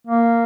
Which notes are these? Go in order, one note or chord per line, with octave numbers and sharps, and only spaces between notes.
A#3